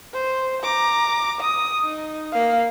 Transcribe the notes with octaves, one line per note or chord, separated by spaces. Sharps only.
C5
A#5 D6
D#6
D#4
A#3 F5